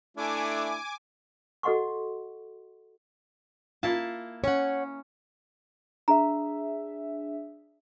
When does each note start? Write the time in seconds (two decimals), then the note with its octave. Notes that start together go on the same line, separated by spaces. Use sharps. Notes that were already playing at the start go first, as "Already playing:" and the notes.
0.17 A3 D4 E4 G#5 D6
1.63 F#4 A4 D#5 F#5 C6 C#6
3.83 A#3 E4 F4 A5
4.44 C#4 C#5 F#5
6.08 D4 G#4 E5 A#5